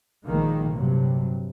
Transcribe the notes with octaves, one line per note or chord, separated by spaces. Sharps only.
A#1 D#3 G#3 A#3
G2 C3 F#3